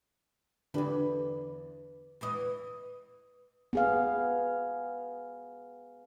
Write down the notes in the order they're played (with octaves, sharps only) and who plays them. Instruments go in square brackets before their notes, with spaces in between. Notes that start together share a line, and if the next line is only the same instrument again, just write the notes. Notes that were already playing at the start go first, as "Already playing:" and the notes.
[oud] E2 B4 [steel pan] D3 D4 G4
[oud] E2 E3 D#5
[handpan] B3 G#4 F5